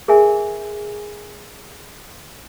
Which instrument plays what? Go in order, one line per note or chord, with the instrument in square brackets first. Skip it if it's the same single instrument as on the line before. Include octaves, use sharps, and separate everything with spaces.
[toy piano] G#4 A#4 E5 G#5